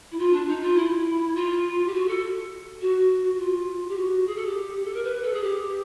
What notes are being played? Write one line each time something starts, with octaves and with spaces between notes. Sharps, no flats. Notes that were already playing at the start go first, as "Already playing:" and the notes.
E4
F4
D4
D#4
F4
E4
F4
G4
F#4
A4
F#4
F4
G4
F#4
G#4
A4
G4
A4
A#4
B4
A4
G#4
G4